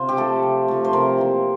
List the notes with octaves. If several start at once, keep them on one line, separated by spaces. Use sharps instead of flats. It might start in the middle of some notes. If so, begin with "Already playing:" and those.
Already playing: C3 F4 C5
G4
F3 A3 A4
C3
F3 A3
C5
C3 A#4
E3 A#3